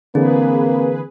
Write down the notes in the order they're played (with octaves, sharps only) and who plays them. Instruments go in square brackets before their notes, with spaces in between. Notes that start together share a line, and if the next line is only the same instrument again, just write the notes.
[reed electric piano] D3 E3 [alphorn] A#3 [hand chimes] C4 [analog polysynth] G#4 B4